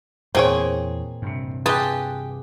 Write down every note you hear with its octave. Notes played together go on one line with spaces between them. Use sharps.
E2 A#2 C4 G#4 C#5
G2 C3
F4 G4 G#4 B4 A5